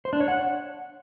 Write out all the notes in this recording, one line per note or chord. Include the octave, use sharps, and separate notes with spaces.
C5
D4
C#5
F#5